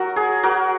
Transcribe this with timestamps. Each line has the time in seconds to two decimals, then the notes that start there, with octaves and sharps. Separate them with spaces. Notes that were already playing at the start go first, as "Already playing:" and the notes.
Already playing: F#3 F#4 A#4
0.16 G#4
0.43 F#4 A#4